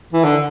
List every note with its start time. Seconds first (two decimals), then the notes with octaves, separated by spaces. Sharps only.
0.13 E3
0.24 D3